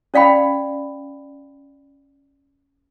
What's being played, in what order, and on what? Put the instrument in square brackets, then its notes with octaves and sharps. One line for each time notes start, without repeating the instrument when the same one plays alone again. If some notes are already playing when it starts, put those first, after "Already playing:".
[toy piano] C#4 D5 F5 G5 B5